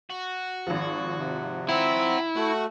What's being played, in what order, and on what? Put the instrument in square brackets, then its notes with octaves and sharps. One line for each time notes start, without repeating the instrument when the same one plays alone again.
[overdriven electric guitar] F#4
[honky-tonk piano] G#1 F3
[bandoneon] C3
[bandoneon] C4 [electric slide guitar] E4 [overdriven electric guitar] F#5 A#5
[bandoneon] A3 [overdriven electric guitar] F#4